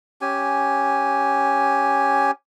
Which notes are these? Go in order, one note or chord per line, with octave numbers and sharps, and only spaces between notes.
C#4 G4 G#5